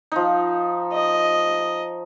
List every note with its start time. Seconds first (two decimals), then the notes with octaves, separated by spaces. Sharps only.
0.12 F3 D#4
0.93 D#5